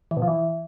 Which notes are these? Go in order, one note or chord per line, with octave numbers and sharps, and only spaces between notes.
E3
B2
F3
E3